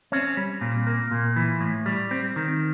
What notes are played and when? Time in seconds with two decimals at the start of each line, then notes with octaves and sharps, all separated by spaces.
0.12 C4 C#4
0.37 G3
0.61 A#2
0.87 A#3
1.11 A#2
1.36 E3
1.61 A2
1.86 G3
2.11 C4
2.36 D#3